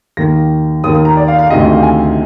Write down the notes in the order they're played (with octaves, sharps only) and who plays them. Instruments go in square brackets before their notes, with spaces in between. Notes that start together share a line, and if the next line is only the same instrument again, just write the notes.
[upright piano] D#2 D#3 A#3 A#6
D#2 D#3 A#3 D#6
D#6
A#5
D5
F5
F5
D2 C3 D#3 D#5
D#5
F5
G#5